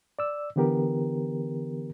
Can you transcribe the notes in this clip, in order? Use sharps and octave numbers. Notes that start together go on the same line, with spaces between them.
D5 E6
D3 E3 B3 G4 A#4